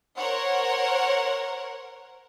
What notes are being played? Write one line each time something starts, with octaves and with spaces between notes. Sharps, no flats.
A#4 C5 C#5 F#5